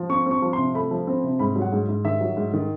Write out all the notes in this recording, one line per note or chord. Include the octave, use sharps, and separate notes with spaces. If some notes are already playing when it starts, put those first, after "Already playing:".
Already playing: F3
C4 C#6
C4 C#6
F3
C3 C6
A3 B5
F3
C4
C3
G#2 B5
F#3
F#5
G#2
G#2
D#3 E5
F#3
G#2
D#3